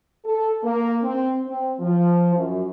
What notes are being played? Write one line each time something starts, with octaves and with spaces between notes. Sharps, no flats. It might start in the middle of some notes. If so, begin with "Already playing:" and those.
A4
A#3
C4
C4
F3
F#2